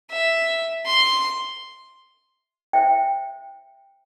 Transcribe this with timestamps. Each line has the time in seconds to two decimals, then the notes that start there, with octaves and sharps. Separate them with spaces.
0.11 E5
0.86 C6
2.73 C5 E5 G5